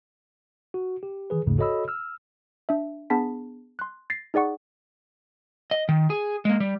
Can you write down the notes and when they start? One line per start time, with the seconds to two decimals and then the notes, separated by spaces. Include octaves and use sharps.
0.74 F#4
1.03 G4
1.30 D#3 E3 G#4 B4
1.46 A1 D#2 G#2 C#3 A3
1.58 F#4 A4 C#5 D#5 B5 E6
1.88 E6 F6
2.69 D4 E5
3.10 B3 D4 G#4 A5 B5 B6
3.79 C6 F#6
4.10 A6 A#6 C7
4.34 D#4 G#4 D5 F#5 C#6
5.71 D#5
5.89 D#3
6.10 G#4
6.45 G#3 A#3
6.60 G3